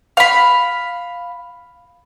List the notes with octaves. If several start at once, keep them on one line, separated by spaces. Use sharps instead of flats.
F5 B5